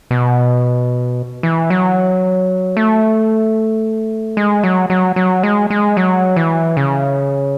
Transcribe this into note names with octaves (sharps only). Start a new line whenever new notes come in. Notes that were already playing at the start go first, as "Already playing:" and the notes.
B2
E3
F#3
A3
G#3
F#3
F#3
F#3
G#3
G#3
F#3
E3
C#3